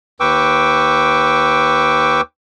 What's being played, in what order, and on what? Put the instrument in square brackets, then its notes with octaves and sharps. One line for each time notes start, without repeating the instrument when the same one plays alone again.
[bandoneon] D#2 B4 G5 C#6 D6 E6